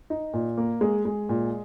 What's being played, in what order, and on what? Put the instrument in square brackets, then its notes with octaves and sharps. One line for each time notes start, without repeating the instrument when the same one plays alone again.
[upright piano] D#4
A#2
A#3
G#3
G#3
A#2